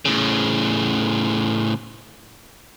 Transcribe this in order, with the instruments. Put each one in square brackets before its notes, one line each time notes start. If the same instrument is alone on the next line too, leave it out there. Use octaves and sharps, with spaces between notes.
[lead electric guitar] A2 C#3